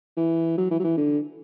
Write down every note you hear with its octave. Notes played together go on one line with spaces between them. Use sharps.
E3
F#3
E3
F#3
E3
D3